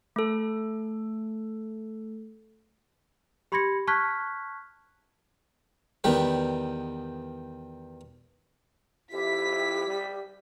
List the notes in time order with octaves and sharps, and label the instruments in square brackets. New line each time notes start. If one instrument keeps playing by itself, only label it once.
[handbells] A3 A4
[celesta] G4 B5 C6 G#6 A#6 C#7
A5 C#6 F6 F#6 G#6 B6
[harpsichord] E2 D#3 G3 B4
[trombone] F2 [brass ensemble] E4 [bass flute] G4 [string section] B6
[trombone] G3